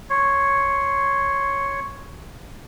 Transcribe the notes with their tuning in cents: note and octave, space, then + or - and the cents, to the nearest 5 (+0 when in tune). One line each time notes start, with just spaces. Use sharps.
C#5 +0 C6 +0